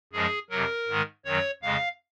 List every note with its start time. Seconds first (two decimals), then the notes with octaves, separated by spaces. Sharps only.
0.13 F#2 F3 G#3 G#4
0.50 F2 C3 F#3 A#4
0.88 G#2 D#3 G#3
1.25 F#2 D#3 F#3 C#5
1.62 F2 C#3 G#3 F5